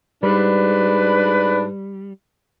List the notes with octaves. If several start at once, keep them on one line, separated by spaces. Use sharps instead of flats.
G#2 G3 D4 B4